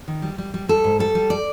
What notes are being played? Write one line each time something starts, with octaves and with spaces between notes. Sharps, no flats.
D#3
G3
G3
G3
G3 A4
G#2
G3 A4
G3
D5